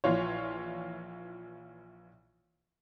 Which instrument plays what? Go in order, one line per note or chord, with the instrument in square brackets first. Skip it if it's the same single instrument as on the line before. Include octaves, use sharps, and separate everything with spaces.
[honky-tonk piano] A#1 E3 F4 C#5